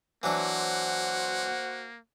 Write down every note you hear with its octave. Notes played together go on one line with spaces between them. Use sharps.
E3 F#3 A#3 D4 F#4 C5 F#5